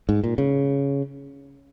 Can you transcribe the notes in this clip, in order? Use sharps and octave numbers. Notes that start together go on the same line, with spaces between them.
G#2
A#2
C#3